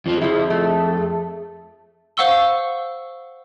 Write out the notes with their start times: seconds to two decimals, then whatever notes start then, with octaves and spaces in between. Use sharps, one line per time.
0.06 F2 F3 F4
0.21 F2 F3 E4 G#4
0.50 A3
2.17 C5 F5 F#5 C#6 E6 G7